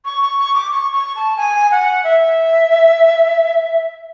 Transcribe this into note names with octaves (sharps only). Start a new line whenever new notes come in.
C#6
C#6
C#6
D6
C#6
C#6
A5
G#5
F#5
E5